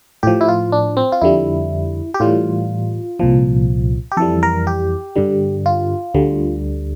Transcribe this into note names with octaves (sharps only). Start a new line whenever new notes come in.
A2 F3 G4
E4
F4
D4
C4
F4
F2 D3 G3 E4
G4
A2 E3 G3 F4
C2 A#2 F3
G4
F2 E3 G3 A4
A#4
G4
G2 D3 G3
F4
D2 D3 G3